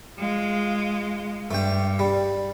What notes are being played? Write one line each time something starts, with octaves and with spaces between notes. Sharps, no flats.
G#3 F4
G2 A3 G5
G3